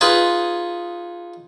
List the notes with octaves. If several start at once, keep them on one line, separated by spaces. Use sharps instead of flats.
D#4 F4 G#4 B4